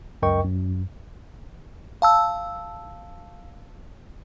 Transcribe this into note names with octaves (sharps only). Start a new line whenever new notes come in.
C#2 F#2 A#4 D#5 G5 C#6
F#2
F5 A5 E6